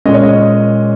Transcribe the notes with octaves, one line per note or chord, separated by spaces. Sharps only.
A#2 G#3 C#4 D#5
C#5
D#5